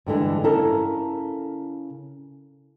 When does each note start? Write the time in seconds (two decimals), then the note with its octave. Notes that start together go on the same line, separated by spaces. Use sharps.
0.06 G2 D3 E3 G#3
0.44 C#3 E4 A4 A#4